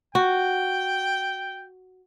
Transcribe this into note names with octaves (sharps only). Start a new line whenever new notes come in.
F#4 G5